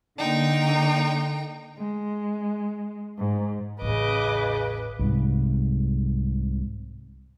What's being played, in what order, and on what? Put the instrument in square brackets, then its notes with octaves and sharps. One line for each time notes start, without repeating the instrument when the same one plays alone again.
[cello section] D3 A#3 [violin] D#4 G5
[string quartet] G#3
G#2
[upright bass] A1 E2 [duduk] C#3 [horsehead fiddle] B4 [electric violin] D#5 D6
[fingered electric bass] C2 G#2 C3